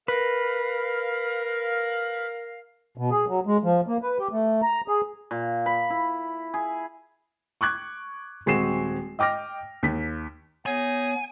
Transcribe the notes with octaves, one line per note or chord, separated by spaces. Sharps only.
A#4 B4 F5
B2
G#4
F#3
G#3
F3
A#3
B4
G4
A3
A#5
G#4
A#2
B5
E4
G#4
C#6 D6 F#6 G#6
D#1 G#3 C4 F#4 C7 E7
D#5 G5 D6 F6 A#6
D#2 B6
B3 D#4 G#4 C#5 G#5